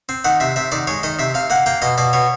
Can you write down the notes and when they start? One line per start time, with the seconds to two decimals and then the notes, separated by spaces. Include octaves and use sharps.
0.09 C4
0.24 D#3 F#5
0.40 C3 E5
0.56 C3 E5
0.72 D#3 D5
0.87 G#3 C#5
1.03 D#3 D#5
1.19 C3 E5
1.34 C3 F5
1.50 A#3 F#5
1.66 A#3 G5
1.82 B2 D#5
1.98 B2 D5
2.13 B2 C#5